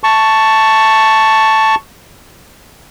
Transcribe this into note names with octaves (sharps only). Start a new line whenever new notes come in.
A5 C#6